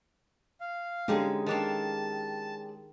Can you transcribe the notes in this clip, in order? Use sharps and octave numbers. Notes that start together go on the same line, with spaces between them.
F5
D3 G#3 C#4 D#4 G4 G#4
D#3 D4 F5 A5